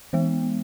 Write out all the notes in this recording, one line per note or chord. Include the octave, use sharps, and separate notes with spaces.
E3 G#3 B3